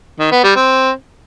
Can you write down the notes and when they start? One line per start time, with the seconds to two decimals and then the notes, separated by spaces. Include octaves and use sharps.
0.19 D#3
0.31 B3
0.43 G3
0.55 C4